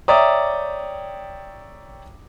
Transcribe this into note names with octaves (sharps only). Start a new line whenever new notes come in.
C#5 D5 E5 G5 A#5 D#6